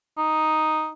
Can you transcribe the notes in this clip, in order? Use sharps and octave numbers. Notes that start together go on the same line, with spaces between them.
D#4